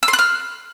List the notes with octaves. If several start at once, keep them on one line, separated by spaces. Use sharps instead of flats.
E6
C6
F#6
F6